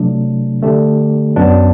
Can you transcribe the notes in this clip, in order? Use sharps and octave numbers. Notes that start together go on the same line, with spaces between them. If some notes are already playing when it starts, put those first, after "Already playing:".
Already playing: C3 F#3 A3 D4
D3 A3 D4 G4
F#2 F#3 B3 D4